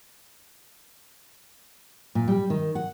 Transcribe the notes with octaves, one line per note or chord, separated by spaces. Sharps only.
A#2
G3
D#3
F#5